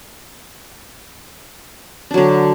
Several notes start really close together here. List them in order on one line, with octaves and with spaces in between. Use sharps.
D4 F#3 D3